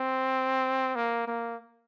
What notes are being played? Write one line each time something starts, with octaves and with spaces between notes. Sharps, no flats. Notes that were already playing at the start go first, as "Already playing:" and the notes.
Already playing: C4
A#3
A#3